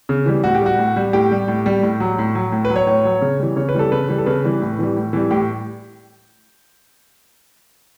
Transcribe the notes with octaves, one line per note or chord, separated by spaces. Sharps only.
C#3
E3 G3
A2 F#4
G4
G3 F#4
A2
G3
A2 G4
G3
A2
G3
A2
F#3
A2
F#3
A2
B4
F#3
C#5
A2
F#3
C#3
E3 G3
C#3 C#5
B4
E3 G3 A4
C#3 B4
E3 G3
A4
C#3 B4
E3 G3
A2
E3 G3
A2
E3 G3
A2 G4